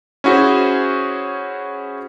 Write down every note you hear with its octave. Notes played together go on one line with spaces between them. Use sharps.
C#4 E4 F#4 G#4 C5